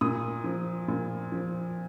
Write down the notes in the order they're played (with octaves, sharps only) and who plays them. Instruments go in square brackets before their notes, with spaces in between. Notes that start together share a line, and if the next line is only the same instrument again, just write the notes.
[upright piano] A#2 D#6
F3
A#2
F3